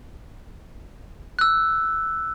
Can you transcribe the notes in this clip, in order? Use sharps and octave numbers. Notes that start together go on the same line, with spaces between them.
E6 F#6